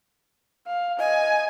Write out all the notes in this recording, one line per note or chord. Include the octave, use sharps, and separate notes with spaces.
F5
D#5 G#5